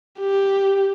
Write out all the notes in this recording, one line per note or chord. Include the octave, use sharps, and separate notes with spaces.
G4